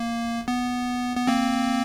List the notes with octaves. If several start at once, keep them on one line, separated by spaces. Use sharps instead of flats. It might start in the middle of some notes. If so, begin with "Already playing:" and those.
Already playing: A#3
B3
B3
A#3 C4